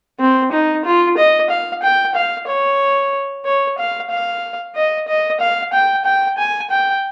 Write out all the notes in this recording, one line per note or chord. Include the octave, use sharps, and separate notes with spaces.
C4
D#4
F4
D#5
F5
G5
F5
C#5
C#5
F5
F5
D#5
D#5
F5
G5
G5
G#5
G5